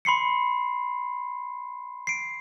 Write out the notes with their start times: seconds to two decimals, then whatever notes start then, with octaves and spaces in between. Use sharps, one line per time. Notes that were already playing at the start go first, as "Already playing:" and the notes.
0.05 B5 C6 C7 C#7
2.07 C7 D7